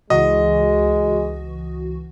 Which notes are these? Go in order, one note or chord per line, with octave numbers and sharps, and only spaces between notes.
C#2 E3 G#3 F#4 D#5